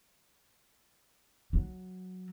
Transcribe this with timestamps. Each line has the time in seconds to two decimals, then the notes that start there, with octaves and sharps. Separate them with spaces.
1.53 F#3